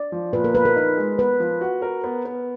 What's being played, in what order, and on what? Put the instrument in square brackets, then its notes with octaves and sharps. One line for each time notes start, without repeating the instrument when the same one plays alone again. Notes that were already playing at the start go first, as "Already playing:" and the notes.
Already playing: [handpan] D5
[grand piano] F3
[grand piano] A#2 [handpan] B4
[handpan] A#4
[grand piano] F3 [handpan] B4
[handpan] A#4
[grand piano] D#4
G#3
[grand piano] B3 [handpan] B4
[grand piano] F3
F#4
A#4
B3
B3